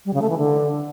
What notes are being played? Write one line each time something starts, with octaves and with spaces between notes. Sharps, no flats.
G3
C#3
A3
E3
D3